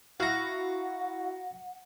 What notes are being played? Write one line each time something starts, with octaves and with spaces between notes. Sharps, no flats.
E4 F#4 F5 F#5 A#5